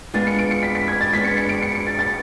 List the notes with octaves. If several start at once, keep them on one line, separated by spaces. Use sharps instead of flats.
G#3 B3 D4 F4 A6
C#7
D7
C#7
B6
B6
G#6
A6
G#3 B3 D4 B6
C#7
C#7
D7
C#7
C#7
A6
A6